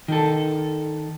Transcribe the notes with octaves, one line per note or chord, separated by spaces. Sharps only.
D#3 A4